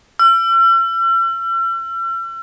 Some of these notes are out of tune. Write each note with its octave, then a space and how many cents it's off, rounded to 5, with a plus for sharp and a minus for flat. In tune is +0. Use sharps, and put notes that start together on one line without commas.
E6 +45